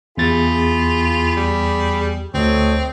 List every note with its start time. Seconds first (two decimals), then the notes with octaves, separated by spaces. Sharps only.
0.18 E2 F4 G4 G#4 B5 A6
1.37 G3
2.34 D2 C4 A4 C#5 D#5